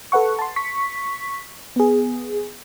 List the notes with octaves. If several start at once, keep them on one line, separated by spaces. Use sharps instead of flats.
A4 B4 F#5 C#6
A5 C6
C#6 B6
B3 G#4